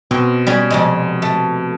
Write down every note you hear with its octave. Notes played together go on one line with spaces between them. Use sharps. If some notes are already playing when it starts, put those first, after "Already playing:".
B2 C4
G3 C#4 G#4
F2 C3 G#3
A3